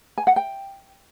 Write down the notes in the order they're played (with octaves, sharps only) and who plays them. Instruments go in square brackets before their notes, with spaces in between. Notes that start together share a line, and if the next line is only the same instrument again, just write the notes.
[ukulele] G#5
F#5
G5